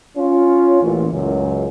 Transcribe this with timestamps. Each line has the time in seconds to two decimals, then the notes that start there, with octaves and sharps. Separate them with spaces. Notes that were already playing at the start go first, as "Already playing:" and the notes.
0.17 C#4 F4
0.82 A1 A#2
1.12 C#2 F#2